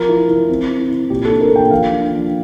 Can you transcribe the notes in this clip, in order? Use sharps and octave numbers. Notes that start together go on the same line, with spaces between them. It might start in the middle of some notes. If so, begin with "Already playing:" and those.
Already playing: F3 A#4
E4
E4
C4
E4
E4
A#2 G4
A4
D4
A#4
A#2 G5
F3 F5
D4
F3